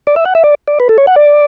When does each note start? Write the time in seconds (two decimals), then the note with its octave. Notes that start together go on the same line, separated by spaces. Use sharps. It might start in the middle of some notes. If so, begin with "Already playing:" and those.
0.07 D5
0.16 E5
0.25 F#5
0.35 E5
0.44 D5
0.68 D5
0.80 B4
0.89 A4
0.98 C#5
1.07 F#5
1.16 D5